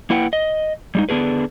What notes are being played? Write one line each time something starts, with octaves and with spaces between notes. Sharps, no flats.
A#3 E4 B4 F#5 G5
D#5
G3 G#3 D#4
D3 B3 C4 D4 G#4 B4